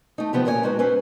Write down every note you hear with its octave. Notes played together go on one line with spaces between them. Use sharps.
A3 D#4
C3 D#3 F3 B3 G4
A#2 C#4 A#4 C#5 G#5
G#3 D#4 F#4 B4
C#4 A4 B4 C5